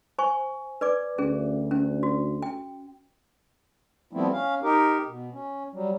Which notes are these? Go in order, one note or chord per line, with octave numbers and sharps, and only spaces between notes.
C5 G#5 C#6
B4 D5 D6
D2 C#4 G#4
C#4
F#4
G5
F3 G3 A3 B3 C4 E4
C#4 F5
D#4 G4 A#4
B2
C#4
F#3 G3